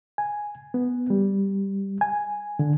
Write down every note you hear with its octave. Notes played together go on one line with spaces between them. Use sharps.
G#5
B3
G3
G#5
D3